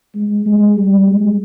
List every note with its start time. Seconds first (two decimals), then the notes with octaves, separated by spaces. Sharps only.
0.15 G#3
0.46 G#3
0.76 G3
1.07 G#3